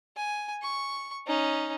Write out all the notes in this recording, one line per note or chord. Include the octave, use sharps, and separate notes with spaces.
G#5
C#6
C#4 D#4